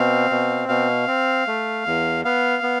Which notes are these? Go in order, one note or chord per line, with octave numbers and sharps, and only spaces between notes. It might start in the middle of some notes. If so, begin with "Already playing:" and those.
Already playing: B2 C4 F5
B2
B2 F5
C4
A3
E2
B3 F5
B3